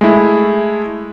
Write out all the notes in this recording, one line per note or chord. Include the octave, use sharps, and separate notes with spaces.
G#3 A3 E4